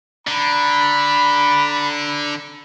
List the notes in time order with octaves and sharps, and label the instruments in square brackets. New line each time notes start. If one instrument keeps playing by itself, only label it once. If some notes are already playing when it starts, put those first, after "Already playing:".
[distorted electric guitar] D3 [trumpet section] A#5 B5